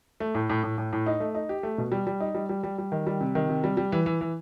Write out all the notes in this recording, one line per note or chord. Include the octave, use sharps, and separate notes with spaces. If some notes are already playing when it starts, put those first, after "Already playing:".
A3
A2
A2
A2
A2
A2
D#4
A3
D#4
G4
A3
B2
G3
G3
D#4
G3
G3
G3
G3
D#3
G3
C3
D#3
C3
G3
G3
E3
E3
E3